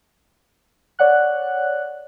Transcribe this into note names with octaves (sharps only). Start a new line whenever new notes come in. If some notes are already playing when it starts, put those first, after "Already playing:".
C#5 D5 F#5 F#6